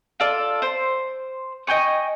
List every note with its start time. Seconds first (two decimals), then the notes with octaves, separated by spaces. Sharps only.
0.20 F4 A4 D5
0.62 C5
1.67 D#5 G5 G#5 C#6